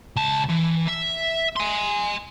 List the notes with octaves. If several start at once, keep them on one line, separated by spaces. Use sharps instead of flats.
C#2 A5
E3
E5
G#5 C6